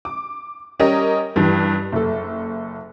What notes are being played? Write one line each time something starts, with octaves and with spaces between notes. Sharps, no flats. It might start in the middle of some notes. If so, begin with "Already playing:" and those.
D6
G3 C#4 G4 A#4 D#5
G2 E3
F#1 A4